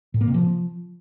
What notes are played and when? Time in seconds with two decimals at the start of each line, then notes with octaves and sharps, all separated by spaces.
0.14 A2
0.21 A#3
0.27 C3
0.34 F3